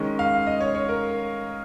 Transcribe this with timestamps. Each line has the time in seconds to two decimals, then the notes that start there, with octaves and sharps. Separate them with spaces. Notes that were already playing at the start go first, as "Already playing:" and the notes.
Already playing: D#3 G#3 C#4
0.19 F5
0.47 D#5
0.61 C#5
0.75 C#5
0.89 A#4